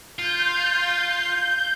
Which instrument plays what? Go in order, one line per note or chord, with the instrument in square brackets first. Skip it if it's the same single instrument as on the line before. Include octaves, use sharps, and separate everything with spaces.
[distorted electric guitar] F4 [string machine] G6